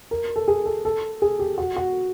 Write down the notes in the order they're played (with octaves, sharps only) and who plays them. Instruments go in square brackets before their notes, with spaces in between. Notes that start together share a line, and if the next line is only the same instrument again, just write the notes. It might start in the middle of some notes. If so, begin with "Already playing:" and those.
[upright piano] A#4
A4
G#4
A4
A4
G#4
G4
F#4
F#4